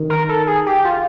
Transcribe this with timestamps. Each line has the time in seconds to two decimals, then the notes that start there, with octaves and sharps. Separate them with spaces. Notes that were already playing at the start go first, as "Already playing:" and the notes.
Already playing: D#3
0.10 A#4
0.29 A4
0.47 G#4
0.66 G4
0.85 F4